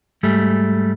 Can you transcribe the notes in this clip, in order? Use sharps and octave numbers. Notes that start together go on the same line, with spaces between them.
G#2 G3 A3